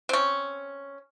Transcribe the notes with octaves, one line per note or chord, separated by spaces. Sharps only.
C4 C#4